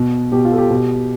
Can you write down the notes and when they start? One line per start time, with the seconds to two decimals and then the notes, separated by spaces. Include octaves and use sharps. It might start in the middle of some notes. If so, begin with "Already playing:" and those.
Already playing: B2
0.32 B2 G4
0.45 F4
0.52 A4
0.58 G4
0.70 B2